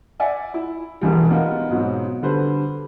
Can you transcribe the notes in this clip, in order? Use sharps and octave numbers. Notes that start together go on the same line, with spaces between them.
D5 E5 F#5 G#5
E4
E1 A#1 E2 G3
B3 D#4 F4 F#4 A#4
G#2 B2 F#3 C4
D3 G3 A4 B4 C5